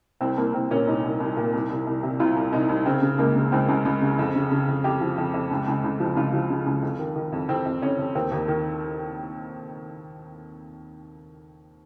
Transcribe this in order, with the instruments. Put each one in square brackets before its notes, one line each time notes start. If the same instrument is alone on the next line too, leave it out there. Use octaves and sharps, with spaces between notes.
[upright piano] C2 C4
C2 A#3
C2 C4
A#2 C#4
C2 D#4
C2
C2
A#2
C2
C2
C2
C3
C2 F4
C2
C2 D#4
C2
C#3 C4
C#3
C#2 A#3
C#3
C#2 C4
C#2
C#2
C#3
F2
C#3
C#3
F2
F2 G4
F3
F2
F2
C#2
C#2
C#2
F3
C#2 F4
F3
C#3
C#2
F2
D#3
D#3
F2
F2 C4
F2
F2 C#4
F2
D#2 C4
D#2
D#3